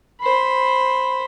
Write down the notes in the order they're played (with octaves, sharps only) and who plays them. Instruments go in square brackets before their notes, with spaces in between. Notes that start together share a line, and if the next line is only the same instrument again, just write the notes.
[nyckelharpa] C5 B5